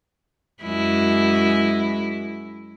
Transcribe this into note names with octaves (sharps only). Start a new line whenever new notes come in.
F#2 G#3 E4